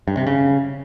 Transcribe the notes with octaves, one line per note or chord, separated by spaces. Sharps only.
G2
C3
C#3